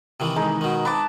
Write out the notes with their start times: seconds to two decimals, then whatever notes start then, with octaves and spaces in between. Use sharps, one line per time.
0.20 C3 D#3 E3
0.36 G#3 D#4
0.61 B2 D#3
0.85 C4 B4 A5 D6